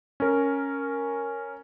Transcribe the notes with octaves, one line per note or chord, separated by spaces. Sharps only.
C#4 A#4